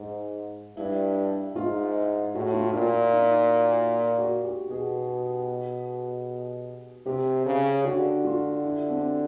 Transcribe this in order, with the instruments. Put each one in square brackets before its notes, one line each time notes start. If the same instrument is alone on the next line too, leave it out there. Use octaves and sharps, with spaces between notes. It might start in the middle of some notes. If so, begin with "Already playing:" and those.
Already playing: [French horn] G#2
[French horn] G2 [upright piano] E4
[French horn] G#2 [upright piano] F4
[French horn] A2 [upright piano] F#4
[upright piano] F4
[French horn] A#2 [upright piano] F4
[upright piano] E4
D#4
F#4
G4
[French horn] B2 [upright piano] G#4
[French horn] C3 [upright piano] G4
[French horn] C#3
[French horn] D3 [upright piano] F#4
[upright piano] F4
E4
C4